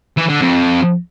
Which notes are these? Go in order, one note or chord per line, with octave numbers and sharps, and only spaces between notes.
E3
D3
F2